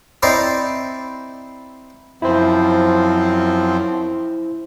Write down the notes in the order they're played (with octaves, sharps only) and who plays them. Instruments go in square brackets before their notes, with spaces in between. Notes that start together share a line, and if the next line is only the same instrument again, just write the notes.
[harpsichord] C4 D#4 E4 C5 D5 D#5
[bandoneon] F#2 F3 C4 [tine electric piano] E4 C5